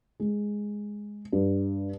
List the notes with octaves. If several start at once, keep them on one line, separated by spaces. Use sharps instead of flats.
G#3
G2